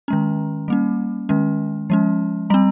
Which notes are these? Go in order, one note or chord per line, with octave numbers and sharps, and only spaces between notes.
D#3 G#3 C#4 A#5
G3 A#3 C#4
D#3 G#3 C#4
F3 G#3 C#4
G3 C4 A#5